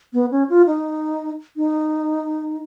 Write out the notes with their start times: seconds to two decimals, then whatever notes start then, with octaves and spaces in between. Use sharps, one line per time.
0.13 B3
0.31 C#4
0.50 F4
0.67 D#4
1.57 D#4